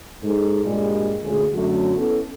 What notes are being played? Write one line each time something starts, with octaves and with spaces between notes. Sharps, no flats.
G#2 A4
G2 A#2 G3 G#3
D2 A#2 C#3 G#3 G#4
F#2 D3 F#3 A3 F#4
B3 C#4 E4 A4